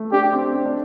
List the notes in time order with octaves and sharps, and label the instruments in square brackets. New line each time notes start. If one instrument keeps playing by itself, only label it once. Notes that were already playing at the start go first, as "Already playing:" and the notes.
Already playing: [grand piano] A3
[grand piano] D4 [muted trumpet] G4
[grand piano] C4
D4
D4